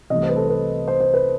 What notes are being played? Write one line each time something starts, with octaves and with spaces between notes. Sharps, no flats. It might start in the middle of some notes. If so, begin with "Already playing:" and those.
C2 C3 E3 A3 D#5
C5
B4
A4
B4
C5
C5
B4